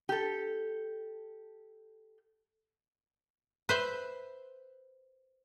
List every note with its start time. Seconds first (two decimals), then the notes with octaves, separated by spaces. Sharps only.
0.09 G4 A4
3.69 B4 C5 E5